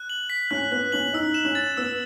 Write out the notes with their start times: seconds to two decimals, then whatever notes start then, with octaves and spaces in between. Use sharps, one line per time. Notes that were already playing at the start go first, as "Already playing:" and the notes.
Already playing: F#6
0.10 F#7
0.30 B6
0.51 C#4 F#6
0.71 B3 F#6
0.92 C#4 F#7
1.13 D#4 E6
1.34 E7
1.45 C#4
1.55 A6
1.77 B3 E6